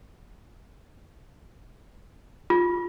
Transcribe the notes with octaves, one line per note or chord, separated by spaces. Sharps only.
F4